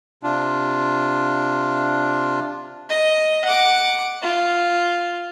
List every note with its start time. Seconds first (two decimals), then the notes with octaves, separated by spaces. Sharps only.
0.23 C3 D4 F4
2.90 D#5
3.45 F#5 D6
4.22 F4